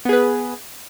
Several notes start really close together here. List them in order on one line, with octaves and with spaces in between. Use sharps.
B3 G#4 B4